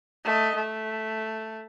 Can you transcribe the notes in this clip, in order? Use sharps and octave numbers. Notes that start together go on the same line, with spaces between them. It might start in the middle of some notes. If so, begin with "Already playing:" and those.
A3 D#5
A3